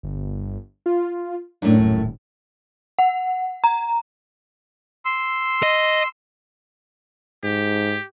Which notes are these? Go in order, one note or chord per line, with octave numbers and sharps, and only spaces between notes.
G1
F4
F#2 A2 D4
D#1
F#5
A#5
C6 E6
D#5
G#2 G4